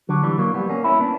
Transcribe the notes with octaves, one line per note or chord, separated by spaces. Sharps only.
D3 F#3
E3 G3
F#3 A#3
G3 B3
A#3 C#4
C#4 E4
B3 D4